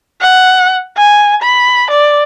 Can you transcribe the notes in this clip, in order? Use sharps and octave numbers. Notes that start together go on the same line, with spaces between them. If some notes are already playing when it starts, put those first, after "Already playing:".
F#5
G#5
B5
D5